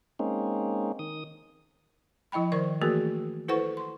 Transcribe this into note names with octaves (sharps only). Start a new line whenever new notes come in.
G#3 A#3 C4 C#4 D#4
D#3 D#6
F3 E4 D#5 G5 B5
D#3 A#4 C5 D5 C#6
E3 A3 A#3 F#4 G#4 A#4
E4 A4 B4 C5 F#5 C#6
C6